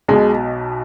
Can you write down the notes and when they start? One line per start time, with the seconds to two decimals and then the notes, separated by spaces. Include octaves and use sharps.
0.08 B1 B2 G#3